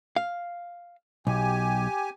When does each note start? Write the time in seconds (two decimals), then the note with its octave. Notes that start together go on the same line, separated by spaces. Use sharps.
0.16 F5
1.27 B1 G4 G#5